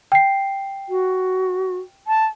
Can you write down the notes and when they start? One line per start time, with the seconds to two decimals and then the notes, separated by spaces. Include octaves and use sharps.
0.12 G5 C7
0.89 F#4
2.07 A5